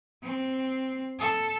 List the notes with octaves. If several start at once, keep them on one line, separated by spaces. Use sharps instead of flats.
C4
A4